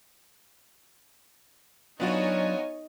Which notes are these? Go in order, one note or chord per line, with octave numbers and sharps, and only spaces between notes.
F#3 B3 D4 D#4 F4 F#4 C#5 G#5